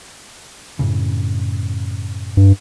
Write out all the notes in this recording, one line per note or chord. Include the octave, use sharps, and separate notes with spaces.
F#2 A2 C#3
G2